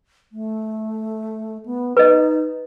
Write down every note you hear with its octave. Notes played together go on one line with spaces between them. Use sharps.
A3
B3
D#4 B4 D#5